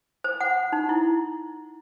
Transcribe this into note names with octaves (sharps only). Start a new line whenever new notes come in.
C5
F#5
D#4
E4